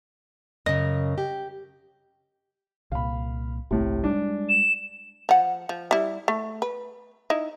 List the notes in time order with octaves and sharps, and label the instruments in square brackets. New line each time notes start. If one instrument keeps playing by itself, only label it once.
[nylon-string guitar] F#2 C#3 [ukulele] D#5
[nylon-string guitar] G4
[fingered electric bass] C2 A#2 [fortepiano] F5 B5
[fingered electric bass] G1 C2 [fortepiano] A2 C3
[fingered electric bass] G3 G#3 [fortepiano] D4
[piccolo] E7
[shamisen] F3 F#5
F3
G3 E4
A3
B4
D#4 E4